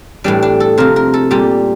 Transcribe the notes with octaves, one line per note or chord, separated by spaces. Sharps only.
A2 E3 G3 D4
D4
A4
C3 F3 A#4
A#4
A4
A#2 G3 G4